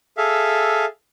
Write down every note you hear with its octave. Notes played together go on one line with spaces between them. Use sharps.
G#4 A4 E5 F5